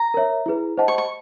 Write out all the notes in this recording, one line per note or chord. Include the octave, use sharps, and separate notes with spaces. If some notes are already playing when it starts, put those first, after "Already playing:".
Already playing: A#5
A#4 C#5 E5
E4 G#4 B4
C5 D#5 F#5 A5
C#6
C#6